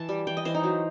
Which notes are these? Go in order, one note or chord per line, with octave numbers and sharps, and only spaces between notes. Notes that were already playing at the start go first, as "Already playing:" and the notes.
Already playing: E3 A5
G3
E3 G5
D#5
E3 C5
D#4
F#3